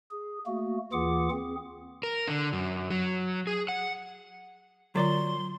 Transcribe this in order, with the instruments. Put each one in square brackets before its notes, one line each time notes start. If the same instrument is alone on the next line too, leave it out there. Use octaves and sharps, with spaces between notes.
[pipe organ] G#4
A3 A#3 F#4
D#2 E3 F4 G#4 F#5 D6
C4 G#4
[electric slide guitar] A#4
D3
F#2
F#3
G#4
F#5
[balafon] D3 F4 A#5 [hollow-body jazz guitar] F#3 D5 [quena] C6